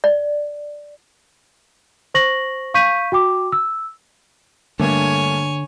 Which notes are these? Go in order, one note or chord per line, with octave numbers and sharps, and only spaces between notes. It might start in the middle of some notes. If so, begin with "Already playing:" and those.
D5
C5 C#6 A#6 F#7
F5 C#6 G6 B6 D#7
F#4 G5 D6
E6
G2 D3 A3 A#3 C#5 G#5